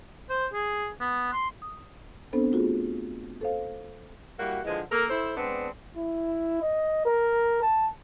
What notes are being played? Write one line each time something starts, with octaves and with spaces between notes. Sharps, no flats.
C5
G#4
B3
C6
D#6
B3 C4 D4 A4 C5
A3 F4 F#4 G#4
A4 C5 F5
G3 A#3 E4 F#4
D3 E3 F3 G#3
A#3 A4 A#4
E4 A4 C5
G#3 B3 C4 D4
E4
D#5
A#4
A5